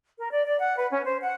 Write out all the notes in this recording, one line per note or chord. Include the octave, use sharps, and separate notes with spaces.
A#4
D5
D5
F#5
B4
C#4
C5
F#5